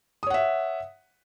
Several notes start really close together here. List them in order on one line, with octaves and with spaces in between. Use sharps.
D#6 C#5 F#5 E5